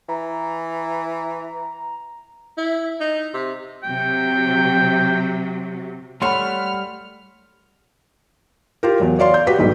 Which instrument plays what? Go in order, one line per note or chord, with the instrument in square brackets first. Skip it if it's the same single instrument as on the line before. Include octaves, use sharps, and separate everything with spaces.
[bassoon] E3 [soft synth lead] A#5
[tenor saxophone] E4
D#4
C3
[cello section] C3 F#3 [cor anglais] G5
[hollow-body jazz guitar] G3 A3 C#5 [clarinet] F#5 [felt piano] B5 C6 [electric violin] F6
[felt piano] F4 G4 A#4
E2 F#3
C#5 D5 F5 C6
G6
F#4 G4 B4 B6
B1 G#2 G3